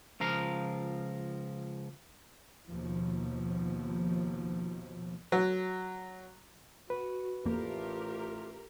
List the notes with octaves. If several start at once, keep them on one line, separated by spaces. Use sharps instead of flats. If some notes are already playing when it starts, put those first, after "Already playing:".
C#2 F3 A#4 F5
D#2 B2 F3
F#3
F#4 B4
A1 F2 A3 A#3 F4 G4 A#4